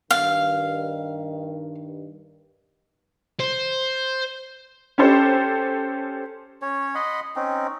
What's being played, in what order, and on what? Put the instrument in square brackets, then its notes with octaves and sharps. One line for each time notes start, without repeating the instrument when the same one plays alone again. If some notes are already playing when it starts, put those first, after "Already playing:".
[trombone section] G2 D#3 [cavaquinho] F5
[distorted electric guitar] C5
[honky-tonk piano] C#4 G4 A4 C5
[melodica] C#4 C#5
D#5 F#5 B5 C6
C4 C#4 D#4